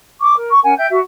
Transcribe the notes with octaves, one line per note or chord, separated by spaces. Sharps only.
C#6 D6
A#4
C#6
C#4 A#4 F#5 G#5
E5 G5 G6
F#4 E5